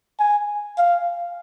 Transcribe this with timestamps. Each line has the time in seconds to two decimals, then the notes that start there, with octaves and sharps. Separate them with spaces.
0.20 G#5
0.78 F5